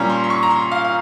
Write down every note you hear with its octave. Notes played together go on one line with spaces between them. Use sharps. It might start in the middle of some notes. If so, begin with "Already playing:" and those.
Already playing: A#2 G3 C#4 A#5
C6
C6
C#6
A#5
C6
F5
F5